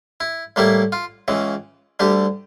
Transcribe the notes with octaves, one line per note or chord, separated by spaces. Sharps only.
E4
A2 G3 A#3 E4
F4
C#2 C#3 E3
D2 D3 G3 G4